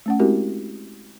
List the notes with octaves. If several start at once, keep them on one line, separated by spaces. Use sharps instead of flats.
A3 C#4 F#5
G#3 C4 E4 F#4 G4 A#4